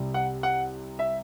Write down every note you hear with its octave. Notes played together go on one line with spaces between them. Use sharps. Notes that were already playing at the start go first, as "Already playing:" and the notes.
Already playing: C2 C3 G3
F#5
F#5
E5